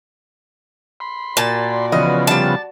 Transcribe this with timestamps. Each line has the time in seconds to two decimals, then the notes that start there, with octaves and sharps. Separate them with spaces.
1.00 B5 C6
1.37 A#2 F#4 D5 A5
1.92 C#3 E3 F3 B3 D#5
2.27 C3 G3 A5